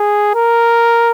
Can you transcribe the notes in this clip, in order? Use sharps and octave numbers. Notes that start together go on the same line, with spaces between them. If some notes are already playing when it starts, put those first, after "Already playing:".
Already playing: G#4
A#4